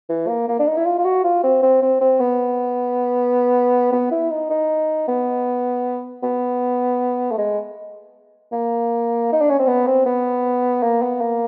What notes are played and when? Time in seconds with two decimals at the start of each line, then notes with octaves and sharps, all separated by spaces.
0.09 E3
0.28 A#3
0.48 A#3
0.59 D4
0.68 D#4
0.77 E4
0.86 F4
0.99 F4
1.05 F#4
1.24 F4
1.43 C4
1.63 C4
1.82 C4
2.01 C4
2.20 B3
3.92 B3
4.11 E4
4.31 D#4
4.50 D#4
5.08 B3
6.23 B3
7.32 A3
7.38 G#3
8.52 A#3
9.32 D#4
9.41 D4
9.50 C#4
9.59 C4
9.67 B3
9.87 C4
10.06 B3
10.83 A#3
11.02 B3
11.21 A#3